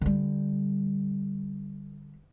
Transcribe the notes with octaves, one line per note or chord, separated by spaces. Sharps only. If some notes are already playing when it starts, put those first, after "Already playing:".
D3 G3